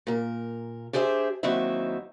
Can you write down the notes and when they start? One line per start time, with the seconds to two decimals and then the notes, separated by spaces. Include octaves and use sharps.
0.07 A#2 A#4
0.93 D4 G4 G#4 C5 E5
1.43 D#2 F#3 C4 D#4 E4 E5